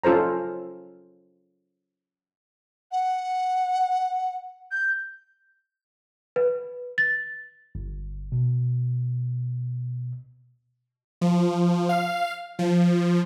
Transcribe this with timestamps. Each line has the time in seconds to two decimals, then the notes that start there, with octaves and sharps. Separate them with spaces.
0.04 C#4 F4 A4 C5 A#5
2.91 F#5
4.71 G6
6.36 B4
6.98 A6
7.75 G1
8.32 B2
11.21 F3
11.89 F5
12.59 F3